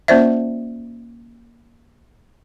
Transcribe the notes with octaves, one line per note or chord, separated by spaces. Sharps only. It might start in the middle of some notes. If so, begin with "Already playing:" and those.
A#3 C#4 F4 C5 D5 E5